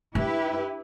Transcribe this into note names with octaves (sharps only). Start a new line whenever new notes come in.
D4 E4 G4 B4